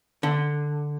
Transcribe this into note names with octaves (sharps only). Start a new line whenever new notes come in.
D3